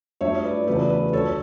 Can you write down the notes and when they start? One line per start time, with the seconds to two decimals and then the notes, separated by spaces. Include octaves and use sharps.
0.21 G2 F#3 A3 C#5 E5
0.44 B4 D5
0.67 E2 C#3 F#3 A3 B4 D5
0.90 B4
1.13 D2 D3 F#3 A4 C#5